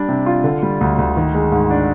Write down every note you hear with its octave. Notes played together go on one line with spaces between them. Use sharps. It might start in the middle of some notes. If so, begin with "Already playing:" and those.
Already playing: G3 D4
C3
F4
D3
G3
D2
D2
D#3
G#3
G#2
D4